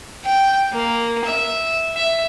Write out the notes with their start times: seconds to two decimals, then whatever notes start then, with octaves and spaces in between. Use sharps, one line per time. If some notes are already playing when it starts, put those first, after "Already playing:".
0.24 G5
0.73 A#3
1.25 E5
1.96 E5